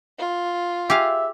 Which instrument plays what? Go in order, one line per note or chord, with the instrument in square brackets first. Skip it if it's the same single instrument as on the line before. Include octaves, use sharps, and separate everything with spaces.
[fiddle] F4
[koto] G4 G#4 F5 [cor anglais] E5